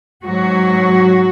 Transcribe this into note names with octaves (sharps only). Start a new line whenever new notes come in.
G#2 F#3 F#4